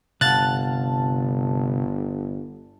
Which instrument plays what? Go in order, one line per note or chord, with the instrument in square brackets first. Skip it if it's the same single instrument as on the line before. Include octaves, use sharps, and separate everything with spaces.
[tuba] G1 [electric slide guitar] C3 F5 F#5 [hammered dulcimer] A5 [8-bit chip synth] F#6 A6